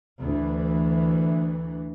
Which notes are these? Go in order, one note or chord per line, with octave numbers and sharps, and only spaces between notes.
D2 E3